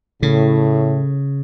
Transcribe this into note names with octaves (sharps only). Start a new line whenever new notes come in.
A2 C#3